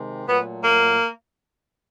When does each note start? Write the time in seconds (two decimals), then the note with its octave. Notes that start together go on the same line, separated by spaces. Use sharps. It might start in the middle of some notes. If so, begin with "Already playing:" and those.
Already playing: C3 D#3 G#3
0.28 A#2 F#3 A3 B3
0.62 A#3